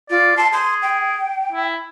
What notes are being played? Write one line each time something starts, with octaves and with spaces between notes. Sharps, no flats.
F4 D5
A5 C6
G#4 C6
G5
E4